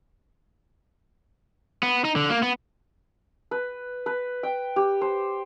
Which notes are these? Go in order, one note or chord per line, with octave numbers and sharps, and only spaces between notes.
B3
D#4
D3
A#3
B3
B4
B4
G5
G4
C5